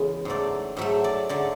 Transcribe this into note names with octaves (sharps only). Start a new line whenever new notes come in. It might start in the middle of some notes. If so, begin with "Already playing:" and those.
Already playing: E2 C#3 G#3 E5
G#2 F#3 A3 D5
G#2 F#3 A3 E5
D5
D3 F#3 A3 D5